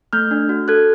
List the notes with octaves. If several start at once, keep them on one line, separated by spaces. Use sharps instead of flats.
A3 F6 G6
D4
F#4
A4 F#6 G#6